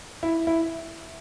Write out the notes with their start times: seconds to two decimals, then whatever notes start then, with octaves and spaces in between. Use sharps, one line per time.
0.23 E4
0.47 E4